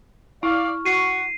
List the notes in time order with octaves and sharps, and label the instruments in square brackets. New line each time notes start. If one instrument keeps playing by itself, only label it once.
[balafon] E4 [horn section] D5 F5 [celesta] C#6 F6
[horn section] F#4 [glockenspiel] C7 D#7